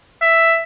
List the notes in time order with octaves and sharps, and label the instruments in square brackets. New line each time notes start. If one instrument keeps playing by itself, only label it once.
[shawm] E5